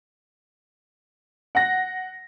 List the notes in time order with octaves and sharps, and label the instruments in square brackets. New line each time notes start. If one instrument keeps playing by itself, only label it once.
[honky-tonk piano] F#5 A#6